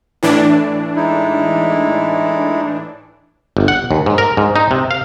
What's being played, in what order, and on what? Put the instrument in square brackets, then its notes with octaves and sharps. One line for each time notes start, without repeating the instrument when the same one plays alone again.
[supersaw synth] A2 E3 D4
[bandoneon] G#3 D#4 E4
[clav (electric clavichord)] G1
F#5
D#2
G#2
A#4
G#2
D#4
C3
F5